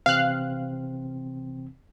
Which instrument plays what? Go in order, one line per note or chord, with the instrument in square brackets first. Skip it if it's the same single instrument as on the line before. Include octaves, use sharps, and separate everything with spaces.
[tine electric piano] C3 E3 C4 [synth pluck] F5 F#6